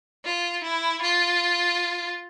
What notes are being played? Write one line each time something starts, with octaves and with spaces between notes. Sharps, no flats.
F4
E4
F4